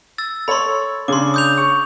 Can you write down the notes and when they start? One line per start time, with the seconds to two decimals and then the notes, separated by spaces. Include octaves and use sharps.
0.18 E6 A6
0.48 A4 C#5 B5 C6
1.08 C#3 D4 C6 D6
1.34 D#6 G6 F7
1.58 C#6